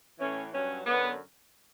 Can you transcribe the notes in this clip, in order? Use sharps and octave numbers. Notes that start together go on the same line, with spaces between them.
A2 E3 C#4
G2 F#3 C#4
F#2 D3 F#3 B3